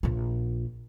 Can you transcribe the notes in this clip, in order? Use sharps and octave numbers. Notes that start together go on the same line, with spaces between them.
A#1 F4